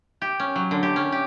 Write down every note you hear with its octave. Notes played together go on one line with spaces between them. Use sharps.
G4
C#4
F#3
D3
G4
C#4
G4